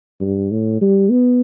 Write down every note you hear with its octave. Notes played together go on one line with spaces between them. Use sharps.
G2
A2
G3
B3